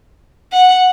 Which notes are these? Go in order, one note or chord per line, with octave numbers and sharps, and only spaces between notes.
F#5